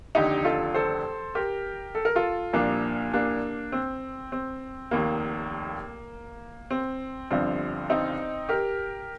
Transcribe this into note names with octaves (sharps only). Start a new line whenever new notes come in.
F1 D#2 D3 D#4 G4
F4 A4
A4 C5
G4 A#4
A4
A#4
F4 A4
C2 A#2 F3 A#3 D4
A#3 D4
C4
C4
F1 D#2 D#3 A#3
C4
G1 G2 D3 F3 C4
C4 D#4
G4 A#4